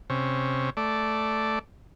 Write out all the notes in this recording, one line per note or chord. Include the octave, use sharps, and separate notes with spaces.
C3 C#4
A3 D5